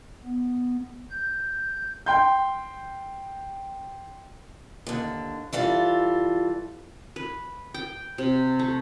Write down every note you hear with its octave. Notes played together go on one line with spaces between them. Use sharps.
B3
G6
G5 C6 G6
D#2 D3
E3 G3 F4 A4
B4
G5
C3
A3